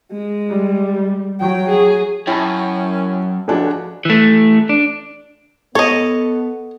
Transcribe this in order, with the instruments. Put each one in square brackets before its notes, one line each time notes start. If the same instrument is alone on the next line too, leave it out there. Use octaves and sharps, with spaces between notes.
[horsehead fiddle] G#3
[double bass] G3
[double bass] F#3 [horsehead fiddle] G5
[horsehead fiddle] G#4
[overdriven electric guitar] F#2 [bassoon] C#4 [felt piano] E4 [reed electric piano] G5 A5
[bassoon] C#2 [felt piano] F3 D4 F#4 [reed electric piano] A4 G#5 A5
[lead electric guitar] E3 A3
D4
[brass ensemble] B3 [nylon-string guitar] A4 [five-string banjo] C#5 D#5